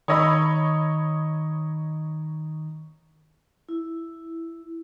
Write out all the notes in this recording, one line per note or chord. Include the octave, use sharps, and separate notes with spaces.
D#3 C#5 D#5 A#5 B5 D#6 E6
E4